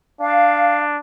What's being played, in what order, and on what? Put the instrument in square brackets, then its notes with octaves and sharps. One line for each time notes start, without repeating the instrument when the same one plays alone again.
[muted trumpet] D4 [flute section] F5